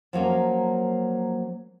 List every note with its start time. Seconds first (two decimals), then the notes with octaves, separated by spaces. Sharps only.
0.13 F3 F#3 A#3 C#4